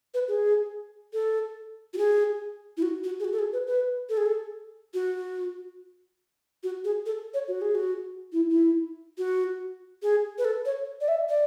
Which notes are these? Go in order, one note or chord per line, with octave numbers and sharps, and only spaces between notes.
B4
G#4
A4
F#4
G#4
E4
F#4
F#4
G#4
F#4
A4
G#4
B4
B4
A4
G#4
A4
F#4
F#4
G#4
A4
C#5
F#4
G#4
F#4
E4
E4
F#4
G#4
B4
A4
C#5
D5
E5
D5